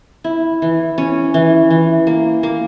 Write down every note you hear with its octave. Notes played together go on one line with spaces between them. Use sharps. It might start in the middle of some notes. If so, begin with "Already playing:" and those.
E4
E3
C#4
E3
E3
A#3
A#3